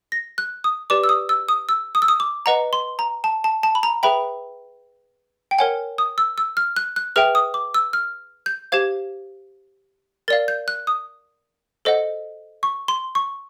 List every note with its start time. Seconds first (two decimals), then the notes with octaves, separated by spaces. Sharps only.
0.12 A#6
0.38 F#6
0.64 D#6
0.90 G4 B4 D5 D6
1.04 E6
1.09 D#6
1.29 E6
1.49 D#6
1.69 E6
1.95 D#6
2.02 E6
2.08 D#6
2.20 D6
2.46 B4 D#5 F#5 A#5
2.73 C6
2.99 A#5
3.24 A5
3.44 A5
3.63 A5
3.75 B5
3.83 A#5
4.03 G#4 B4 E5 G5 B5
5.51 G5
5.58 A#4 C#5 F#5 G#5
5.98 D#6
6.18 E6
6.38 E6
6.57 F6
6.76 F#6
6.96 F#6
7.16 G#4 B4 E5 G5 F6
7.35 D#6
7.54 D6
7.74 E6
7.93 F6
8.46 G6
8.72 G4 C5 F5 G#6
10.28 A#4 D5 F5 A6
10.48 G6
10.68 F#6
10.87 D#6
11.85 A4 C5 D#5 F#5
12.63 C#6
12.88 C6
13.15 C#6